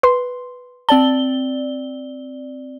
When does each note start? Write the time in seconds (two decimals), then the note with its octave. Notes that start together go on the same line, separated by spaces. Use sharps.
0.03 B4 C6
0.89 C4 D5 A5 G7